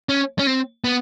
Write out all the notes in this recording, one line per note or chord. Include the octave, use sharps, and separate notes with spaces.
C#4
C#4
C4
B3